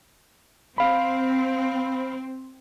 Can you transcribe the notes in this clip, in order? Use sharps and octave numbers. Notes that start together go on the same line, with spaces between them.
C4 F5 B5